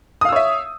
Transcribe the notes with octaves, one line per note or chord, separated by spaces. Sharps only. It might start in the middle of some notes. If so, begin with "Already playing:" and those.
C#5 E5 F5 D#6 E6